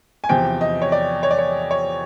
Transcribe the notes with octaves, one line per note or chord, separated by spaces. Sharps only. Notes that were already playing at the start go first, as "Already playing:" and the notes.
G#5
E2 C3 F3 G5
D#5
C#5
D5
C#5
D5
C#5
C#5